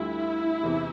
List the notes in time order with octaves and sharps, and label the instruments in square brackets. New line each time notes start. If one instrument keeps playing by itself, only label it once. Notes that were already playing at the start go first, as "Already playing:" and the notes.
Already playing: [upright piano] D2 D3 G3 F4 [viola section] E4
[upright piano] E2 C3 E3